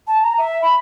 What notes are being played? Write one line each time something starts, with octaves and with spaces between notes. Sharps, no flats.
A5
A#5
E5
B5